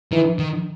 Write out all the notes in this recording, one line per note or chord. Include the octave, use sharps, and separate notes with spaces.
D#3 E3
D#3